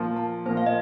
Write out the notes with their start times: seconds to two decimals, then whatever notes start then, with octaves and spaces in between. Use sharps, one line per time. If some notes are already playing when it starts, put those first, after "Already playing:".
Already playing: A#2 F3 A#3
0.16 A5
0.46 A#2 F3 A#3 C5
0.57 F5
0.66 D#5